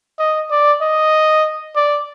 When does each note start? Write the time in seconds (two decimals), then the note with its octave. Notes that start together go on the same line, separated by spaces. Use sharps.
0.19 D#5
0.51 D5
0.81 D#5
1.76 D5